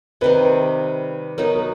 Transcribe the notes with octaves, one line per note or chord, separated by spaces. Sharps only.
C3 D#3 G3 B4
F#3 B3 D#4 A#4
A#4